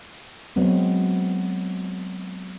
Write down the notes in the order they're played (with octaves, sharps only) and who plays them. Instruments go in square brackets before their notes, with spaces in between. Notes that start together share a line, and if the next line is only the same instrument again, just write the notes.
[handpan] F#3 G#3 B3 C4